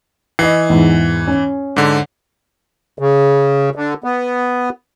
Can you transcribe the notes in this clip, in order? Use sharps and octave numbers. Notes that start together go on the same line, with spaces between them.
E3 D#5 C7
E2 G#2
C#4
G#2 D3
C#3
D3
B3